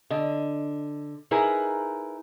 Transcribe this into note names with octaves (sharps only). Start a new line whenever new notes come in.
D3 D#5
D#4 E4 G#4 A#4 B4